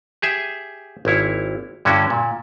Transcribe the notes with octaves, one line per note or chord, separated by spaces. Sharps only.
G4 G#4 E5
G#1 A#3 E4 C#5
G2 D3 C#4 E4 F#4 E5
A#2